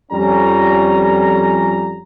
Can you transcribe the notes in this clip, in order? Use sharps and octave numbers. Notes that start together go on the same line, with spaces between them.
F2 G3 C#4 A#5